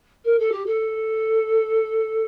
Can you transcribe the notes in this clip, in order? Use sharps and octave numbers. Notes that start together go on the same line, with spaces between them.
A#4
A4
G4
A4